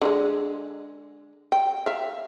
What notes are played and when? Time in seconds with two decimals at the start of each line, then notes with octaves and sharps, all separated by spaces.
0.01 D3 F3 G#3
1.52 G5
1.86 E5 F5